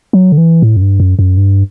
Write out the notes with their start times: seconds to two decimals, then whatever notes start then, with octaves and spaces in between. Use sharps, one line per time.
0.13 F#3
0.32 D3
0.38 E3
0.62 A2
0.77 F#2
0.82 G2
1.00 F#2
1.19 F#2
1.37 G2